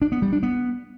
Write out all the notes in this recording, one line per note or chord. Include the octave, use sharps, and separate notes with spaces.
D4
B3
G3
D4
B3